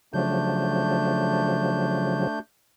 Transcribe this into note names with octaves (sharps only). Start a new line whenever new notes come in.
C#3 F3 F#3 A3 D4 G6